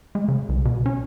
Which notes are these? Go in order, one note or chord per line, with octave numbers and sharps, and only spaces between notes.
G#3
C#3
C2
B2
C#4